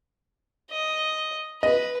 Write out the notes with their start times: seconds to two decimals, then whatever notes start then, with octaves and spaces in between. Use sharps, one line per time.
0.72 D#5
1.63 B4 D#5